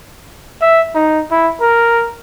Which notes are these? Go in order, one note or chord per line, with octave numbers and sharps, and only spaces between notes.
E5
D#4
E4
A#4